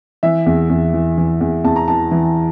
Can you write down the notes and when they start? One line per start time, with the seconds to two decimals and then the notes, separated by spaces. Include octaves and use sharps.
0.23 E3 E5
0.46 E2
0.69 E2
0.94 E3
1.18 E3
1.41 E2
1.64 E2 A5
1.76 A#5
1.88 E3 A5
2.11 E3